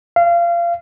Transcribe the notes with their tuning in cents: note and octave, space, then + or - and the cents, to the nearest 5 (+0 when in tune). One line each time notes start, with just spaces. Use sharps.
F5 -25